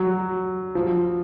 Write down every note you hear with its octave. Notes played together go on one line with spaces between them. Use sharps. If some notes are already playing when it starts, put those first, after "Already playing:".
Already playing: F#3
F3